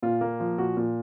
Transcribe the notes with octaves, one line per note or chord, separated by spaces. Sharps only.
A#2 F4
A#3
F3
A#2 F#4
A#2